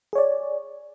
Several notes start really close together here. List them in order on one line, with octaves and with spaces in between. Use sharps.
G#4 C#5 D5